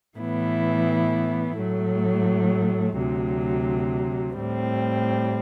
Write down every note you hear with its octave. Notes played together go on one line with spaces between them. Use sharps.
A2 E3 B3 E4
A2 F#3 A3
D2 C3 F#3
A2 G3 C4